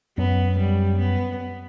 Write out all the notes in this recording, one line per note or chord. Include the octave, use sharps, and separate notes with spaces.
F#2 F#3 B3
G3
B3